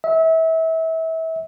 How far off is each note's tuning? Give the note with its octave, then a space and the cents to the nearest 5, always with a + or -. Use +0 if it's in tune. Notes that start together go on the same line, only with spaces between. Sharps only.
E5 -30